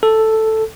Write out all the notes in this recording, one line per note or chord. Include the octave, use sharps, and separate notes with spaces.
A4